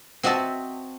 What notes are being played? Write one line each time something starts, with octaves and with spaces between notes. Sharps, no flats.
C4 F#4 D#5 E5 A5